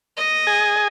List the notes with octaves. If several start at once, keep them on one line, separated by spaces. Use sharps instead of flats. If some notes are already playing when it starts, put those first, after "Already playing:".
D#5
G#4 G#5